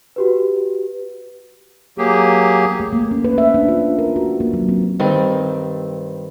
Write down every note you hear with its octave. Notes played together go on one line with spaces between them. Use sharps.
F#4 G4 B4
F#3 A#3 G4 G#4
A3
A#3
C#4
B4
E5
D4
F4
A#4
F#4
A#3
F#3
C4
G2 D#3 C4